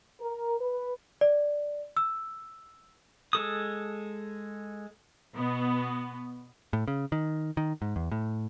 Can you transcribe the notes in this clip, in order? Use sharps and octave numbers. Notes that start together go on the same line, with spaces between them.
A#4
B4
D5
E6
G#3 A4 D#6
B2 B3
A2
C#3
D#3
D#3
G#2
E2
A2